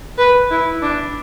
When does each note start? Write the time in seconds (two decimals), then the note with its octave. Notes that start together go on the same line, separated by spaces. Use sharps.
0.18 B4
0.51 E4
0.82 D4